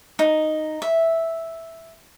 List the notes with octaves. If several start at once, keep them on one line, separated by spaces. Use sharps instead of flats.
D#4
E5